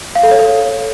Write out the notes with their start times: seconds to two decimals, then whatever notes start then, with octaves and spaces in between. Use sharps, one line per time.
0.15 F5
0.23 A4
0.31 C#5
0.39 A4